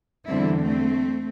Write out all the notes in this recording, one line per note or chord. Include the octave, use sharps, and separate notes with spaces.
E2 D3 G3 C4 E4
A3 C4